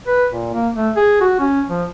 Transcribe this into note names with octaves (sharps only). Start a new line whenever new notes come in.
B4
A#2
A#3
A3
G#4
F#4
C#4
F3